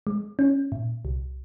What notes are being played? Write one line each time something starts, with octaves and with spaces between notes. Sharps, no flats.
G#3
C#4
A#2
C2